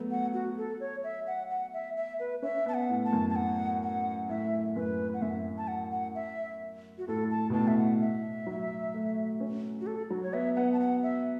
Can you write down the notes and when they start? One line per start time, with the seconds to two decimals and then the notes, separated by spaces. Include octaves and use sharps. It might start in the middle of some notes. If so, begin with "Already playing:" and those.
Already playing: F#3 A3 B3
0.11 F#5
0.33 F#4
0.58 A4
0.80 C#5
1.04 E5
1.27 F#5
1.50 F#5
1.74 E5
1.97 E5
2.20 B4
2.42 C#4 E5
2.66 B3
2.68 A5
2.74 F#5
2.89 A2
3.05 A5
3.13 F#2
3.30 A5
3.36 F#5
3.83 F#5
4.29 A2 E5
4.76 F#2 B4
5.14 F#5
5.22 F#2 E5
5.58 A5
5.68 F#5
5.92 F#5
6.15 E5
6.98 F#4
7.08 A2 A4
7.31 A5
7.50 B2
7.54 A2 A5
7.67 E5
7.78 F#5
8.01 E5
8.46 F#3
8.94 A3
9.40 C#4
9.81 F#4
9.87 A4
10.10 F#3 F#4
10.23 C#5
10.33 B3 E5
10.56 B3 F#5
10.73 A5
10.80 F#5
11.03 E5